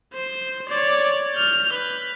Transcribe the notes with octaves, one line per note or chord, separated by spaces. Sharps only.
C5
C#5 D5
F6 G6
B4